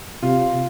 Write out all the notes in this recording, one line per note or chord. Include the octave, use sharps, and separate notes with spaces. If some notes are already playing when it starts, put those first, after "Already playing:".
C3 F4